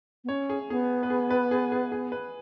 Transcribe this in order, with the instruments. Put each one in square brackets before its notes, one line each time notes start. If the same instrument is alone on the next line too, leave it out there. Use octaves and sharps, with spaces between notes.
[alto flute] B3
[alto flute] C#4 [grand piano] C#5
[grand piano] G#4
[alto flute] B3 [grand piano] G#4
[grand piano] B4
G#4
B4
G#4
G#4
G#4
B4